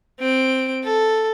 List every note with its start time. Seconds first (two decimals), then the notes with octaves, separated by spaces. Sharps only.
0.20 C4 D7
0.85 A4